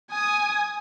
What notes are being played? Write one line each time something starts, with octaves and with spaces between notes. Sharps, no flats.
G#5 D#6